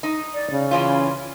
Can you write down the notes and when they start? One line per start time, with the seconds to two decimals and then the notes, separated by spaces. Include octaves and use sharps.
0.03 D#4
0.34 D5
0.51 C#3
0.71 E3 C#4 F4